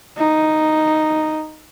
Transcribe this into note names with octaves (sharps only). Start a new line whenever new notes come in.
D#4